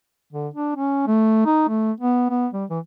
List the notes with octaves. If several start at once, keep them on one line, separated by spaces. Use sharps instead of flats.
D3
D4
C#4
A3
D#4
A3
B3
B3
G3
E3